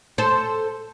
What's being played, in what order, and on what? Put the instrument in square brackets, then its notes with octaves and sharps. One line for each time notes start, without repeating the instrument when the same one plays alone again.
[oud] A4 C5